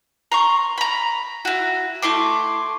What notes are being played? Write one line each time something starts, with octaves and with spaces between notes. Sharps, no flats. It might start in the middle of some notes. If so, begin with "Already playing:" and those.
A#5 C6 C#6
A#5 B5
E4 F#4
A3 E4 C6 D6